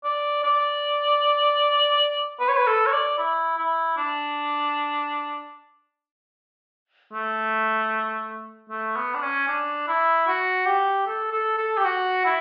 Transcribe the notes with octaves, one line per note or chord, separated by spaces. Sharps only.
D5
D5
B4
C#5
B4
A4
C#5
D5
E4
E4
D4
A3
A3
B3
D4
C#4
D4
E4
F#4
G4
A4
A4
A4
G4
F#4
E4